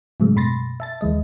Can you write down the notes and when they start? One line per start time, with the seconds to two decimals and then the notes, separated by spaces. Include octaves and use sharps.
0.20 A2 C#3 F#3 G#3 A3
0.36 F#2 B2 B5 C6 A6 A#6
0.80 E5 A5 A6
1.01 D#2 E3 G#3 D#5